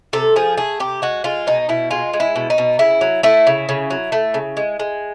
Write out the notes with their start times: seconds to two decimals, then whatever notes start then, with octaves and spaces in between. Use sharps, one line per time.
0.13 C3 A4
0.36 F3 G#4
0.57 A3 G#4
0.80 C3 G4
1.02 G#3 F#4
1.24 G#3 F4
1.47 B2 D#4
1.69 B2 E4
1.91 G#3 F4
2.13 G#3
2.20 E4
2.36 B2
2.50 D#4
2.58 B2
2.79 C#3 E4
3.01 F#3
3.23 A3 E4
3.47 C#3
3.69 C#3
3.90 F#3
4.12 A3
4.34 C#3
4.57 G#3
4.80 G#3